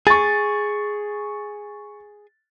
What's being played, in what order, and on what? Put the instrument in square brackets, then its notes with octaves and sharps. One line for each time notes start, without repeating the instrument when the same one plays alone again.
[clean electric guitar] G#4 [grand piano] C#6 A6